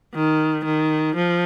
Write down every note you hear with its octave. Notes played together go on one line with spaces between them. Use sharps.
D#3
D#3
F3